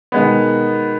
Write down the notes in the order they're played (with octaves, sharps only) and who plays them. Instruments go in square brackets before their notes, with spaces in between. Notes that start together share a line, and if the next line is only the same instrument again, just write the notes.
[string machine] B2 [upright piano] D#3 G#3 B3